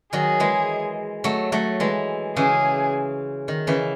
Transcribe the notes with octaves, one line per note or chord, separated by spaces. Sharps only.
D#3 F#3 G#4
E3 G#3
F#3 A3
F#3 A3
E3 G#3
C#3 E3 G#4
D#3
C#3 E3